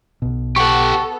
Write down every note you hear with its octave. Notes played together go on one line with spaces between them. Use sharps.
B1 B2
B3 G4 A4 F#5 C#6